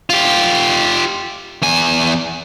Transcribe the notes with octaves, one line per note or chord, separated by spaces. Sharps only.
F4 G4
E2 G#5